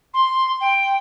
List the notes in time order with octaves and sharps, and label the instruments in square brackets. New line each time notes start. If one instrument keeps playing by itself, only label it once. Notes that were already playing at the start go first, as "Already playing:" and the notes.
[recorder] C6
G5